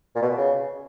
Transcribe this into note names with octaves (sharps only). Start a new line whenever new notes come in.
A#2
B2
C#3